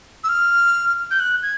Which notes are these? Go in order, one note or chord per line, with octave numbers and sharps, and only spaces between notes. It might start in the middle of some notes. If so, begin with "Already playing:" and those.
E6
F6
G6
F#6
G#6